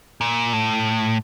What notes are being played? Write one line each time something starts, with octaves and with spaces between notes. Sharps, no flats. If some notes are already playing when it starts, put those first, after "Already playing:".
A#2
A2